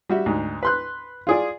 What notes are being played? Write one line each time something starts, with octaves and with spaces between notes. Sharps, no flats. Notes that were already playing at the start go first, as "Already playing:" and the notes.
G3 F#4 E5
D2 G#2
B4 C6 F#6
F4 G#4 D5